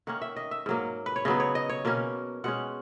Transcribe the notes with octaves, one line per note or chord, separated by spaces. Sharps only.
D#3 A#3 C#4 F#5
E5
D#5
E5
G#2 F#3 A#3
B4
C#5
C#3 F#3 B3 D#5
C#5
D#5
C#5
B2 A#3 C#4
B2 G#3 C#4 F#5